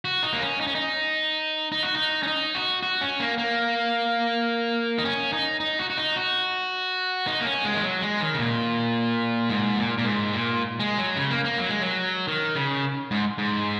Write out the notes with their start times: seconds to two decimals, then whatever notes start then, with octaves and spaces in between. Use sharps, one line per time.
0.05 F#4
0.23 D#4
0.33 A#3
0.42 C#4
0.60 D#4
0.67 C#4
0.75 D#4
1.72 D#4
1.83 F#4
1.95 D#4
2.23 C#4
2.27 D#4
2.55 F#4
2.83 F#4
3.01 C#4
3.20 A#3
3.38 A#3
4.98 D#4
5.05 C#4
5.33 D#4
5.60 D#4
5.79 F#4
5.90 F#4
5.98 D#4
6.16 F#4
7.27 D#4
7.40 A#3
7.46 C#4
7.65 G#3
7.75 D#3
7.83 F#3
8.01 G#3
8.20 D#3
8.34 C#3
8.38 A#2
9.50 G#2
9.78 A#2
9.98 A#2
10.05 G#2
10.33 A#2
10.80 G#3
10.98 F#3
11.16 C#3
11.30 A#3
11.44 A#3
11.58 F#3
11.69 G#3
11.82 F#3
12.27 D#3
12.55 C#3
13.11 G#2
13.38 G#2